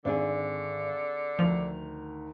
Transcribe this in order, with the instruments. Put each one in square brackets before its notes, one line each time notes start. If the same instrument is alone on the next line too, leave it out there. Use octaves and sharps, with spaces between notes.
[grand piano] G#1 [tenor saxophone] D3 [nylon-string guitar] C4 D4 G#4
[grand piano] D2 F7 [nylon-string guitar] D#3 [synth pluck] F3